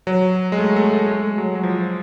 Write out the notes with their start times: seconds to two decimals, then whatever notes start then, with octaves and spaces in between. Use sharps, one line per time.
0.07 F#3
0.52 G#3
0.58 A3
0.76 A3
0.93 A3
1.07 A3
1.12 G#3
1.38 F#3
1.55 F#3
1.63 F3